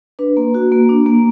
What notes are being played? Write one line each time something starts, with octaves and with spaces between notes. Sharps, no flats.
D4 B4
A#3
F#4
A#3
D4
A#3